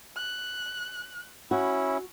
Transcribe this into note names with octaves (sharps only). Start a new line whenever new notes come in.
F#6
C#4 E4 F#4 B5